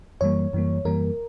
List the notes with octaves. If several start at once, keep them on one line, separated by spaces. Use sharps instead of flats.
F#2 E3 G3 A#3 C#5
F#2 E3 G3 A#3
F#2 E3 G3 A#3 A#4